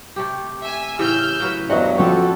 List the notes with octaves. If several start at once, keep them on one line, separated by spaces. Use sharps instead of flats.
C3 A3 G4
E5 G#5
A2 C#3 E3 G4 E6 F6 G6
C#3 F#3 B4
E2 G2 F#3 D#4 F#4 C5 D#5 F#5
F3 G3 C4 C#4 F#4 A4 C#5